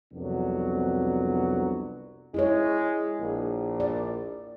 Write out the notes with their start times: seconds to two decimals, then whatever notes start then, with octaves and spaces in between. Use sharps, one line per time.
0.13 C2 F2 F#3 B3 D4
2.34 G#3 E4 G#4 C#5
3.19 A#1
3.80 D5